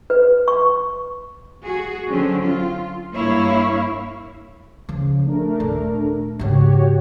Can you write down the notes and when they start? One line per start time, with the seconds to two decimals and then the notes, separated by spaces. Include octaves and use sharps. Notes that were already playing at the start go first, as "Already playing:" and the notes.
0.10 B4
0.48 C#6
1.64 F#4 G#4
2.09 D3 F#3 C4 C#4
2.44 F4
3.13 G2 A#3 E4 C#5 F5
4.89 C#3 F3
5.25 A3 D4 A#4
5.60 D#1
6.39 G#2 C#3 F#4 G4 C#5